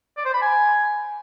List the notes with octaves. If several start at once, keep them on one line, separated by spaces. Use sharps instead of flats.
D5
C5
B5
G#5